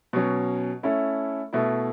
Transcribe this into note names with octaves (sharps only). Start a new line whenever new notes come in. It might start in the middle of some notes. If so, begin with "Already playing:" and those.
B2 F#3 C#4
A3 C#4 E4 A4
B2 A3 E4